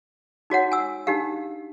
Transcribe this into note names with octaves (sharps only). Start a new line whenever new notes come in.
D#4 F#4 C#5 F#5
G#5 E6
D4 D#4 G4 F5